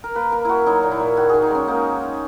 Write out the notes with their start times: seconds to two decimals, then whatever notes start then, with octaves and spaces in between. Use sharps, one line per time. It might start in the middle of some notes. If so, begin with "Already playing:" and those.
0.04 A#4
0.15 A#3 B4
0.32 A#3 A#4
0.45 A#3 E4 F#4
0.67 F#3 D#4
0.83 A#2
0.92 E4
1.00 A#2
1.17 D#3 F#4
1.29 D#3 G#4
1.42 D#4
1.51 G#3 C#4
1.67 A#3 D#4